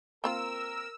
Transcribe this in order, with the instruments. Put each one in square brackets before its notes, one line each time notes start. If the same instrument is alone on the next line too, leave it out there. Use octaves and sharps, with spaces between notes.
[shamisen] A#3 C4 F4 [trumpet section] A#4 [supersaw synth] E6